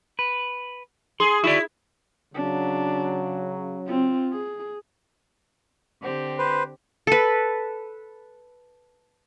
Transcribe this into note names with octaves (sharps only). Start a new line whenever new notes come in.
B4
G#4 C6
E4 F#4 D5
C#3 F#3 D4
C4 F4
G#4
D3 C4 G4
B4 C5
A4 B4